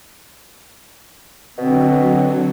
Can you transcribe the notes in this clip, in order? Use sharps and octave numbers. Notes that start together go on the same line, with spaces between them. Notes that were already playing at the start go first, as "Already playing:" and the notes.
B2 D3 F#3 C4